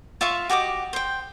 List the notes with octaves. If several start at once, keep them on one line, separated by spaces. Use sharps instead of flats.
F4 E5 F5 C#6
F#4 G4 D#5 D6
C5 G5